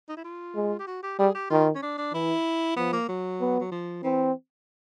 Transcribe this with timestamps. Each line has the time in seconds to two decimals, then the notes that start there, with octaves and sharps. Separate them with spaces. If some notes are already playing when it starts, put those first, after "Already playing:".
0.09 D#4
0.17 E4
0.24 F4
0.55 G#3
0.79 G4
0.87 F#4
1.03 G4
1.19 G3 G#4
1.35 G4
1.50 D#3 F4
1.75 C#4
1.82 D4
1.98 D4
2.13 E3 E4
2.77 F3 B3
2.93 A#3
3.09 F#3
3.41 B3
3.60 F#3
3.71 F3
4.03 E3 C4